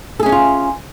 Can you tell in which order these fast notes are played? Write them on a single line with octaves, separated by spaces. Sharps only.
A4 G#4 C#4 D4 F4